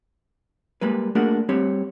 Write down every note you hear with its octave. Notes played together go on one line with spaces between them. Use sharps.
G3 G#3 A#3 B4
A3 A#3 D4 F#4 G#4 A#4
G3 C4 G4 C#5